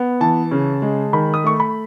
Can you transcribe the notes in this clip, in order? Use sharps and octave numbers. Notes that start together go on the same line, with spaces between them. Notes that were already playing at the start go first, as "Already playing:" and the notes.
Already playing: B3
E3 A5
C#3
G#3
D#3 B5
D#6
A3 C#6
B5